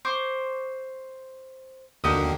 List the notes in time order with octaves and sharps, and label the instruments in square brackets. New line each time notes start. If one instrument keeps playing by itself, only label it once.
[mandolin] C5 C#6 D6
[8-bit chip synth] D#2 D3 A#3 [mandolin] F#4 G4 D#6